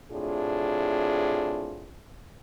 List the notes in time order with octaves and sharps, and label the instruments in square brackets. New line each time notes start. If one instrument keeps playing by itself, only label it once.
[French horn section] A2 C3 D4 F4 G#4